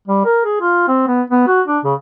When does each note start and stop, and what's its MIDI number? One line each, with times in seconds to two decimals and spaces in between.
0.08 0.20 55
0.25 0.40 70
0.45 0.58 68
0.61 0.85 65
0.88 1.03 60
1.07 1.22 59
1.30 1.43 59
1.47 1.61 66
1.68 1.79 62
1.84 1.94 49